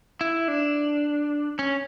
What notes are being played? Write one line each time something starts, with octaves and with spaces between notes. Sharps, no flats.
E4
D4
C#4